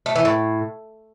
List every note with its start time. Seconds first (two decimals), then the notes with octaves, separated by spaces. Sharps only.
0.06 A3
0.16 E3
0.25 A2